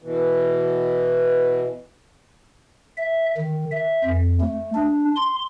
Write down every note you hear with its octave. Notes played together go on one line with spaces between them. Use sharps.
B2 E3
E5
D#3
E5
F2
A3
D4
C6